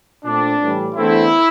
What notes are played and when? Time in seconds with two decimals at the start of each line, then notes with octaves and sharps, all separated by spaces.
0.24 A#2 A3 C4 D4
0.60 A2 E3 G3
0.95 E2 D3 A3 C4 E4